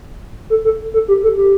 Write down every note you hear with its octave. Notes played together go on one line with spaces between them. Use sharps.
A4
A4
A4
G4
A4
G4